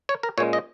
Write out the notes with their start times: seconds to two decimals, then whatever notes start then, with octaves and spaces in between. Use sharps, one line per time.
0.09 C#5
0.23 A#4
0.38 A#2 G#3 C#4 C#5
0.53 D#5